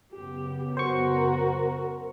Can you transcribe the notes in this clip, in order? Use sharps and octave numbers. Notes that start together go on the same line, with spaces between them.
F#2 C#3 B3 G4
F#4 A#4 C5 C#6